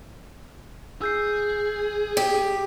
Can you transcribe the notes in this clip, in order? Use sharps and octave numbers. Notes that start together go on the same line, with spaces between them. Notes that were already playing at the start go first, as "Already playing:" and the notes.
G#4 E6 G6 C7
G4